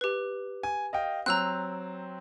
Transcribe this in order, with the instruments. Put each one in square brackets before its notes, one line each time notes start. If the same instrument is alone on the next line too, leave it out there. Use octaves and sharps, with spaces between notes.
[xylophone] G4 B4
[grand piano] G#5
D#5 F5 G5
[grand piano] F#3 C4 [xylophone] A#5 E6 F#6